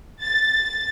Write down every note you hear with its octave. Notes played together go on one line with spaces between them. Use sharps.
A6